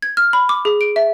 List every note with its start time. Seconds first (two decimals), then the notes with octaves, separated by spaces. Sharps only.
0.02 G#6
0.17 F6
0.33 B5
0.49 D6
0.65 G#4
0.81 D7
0.96 E5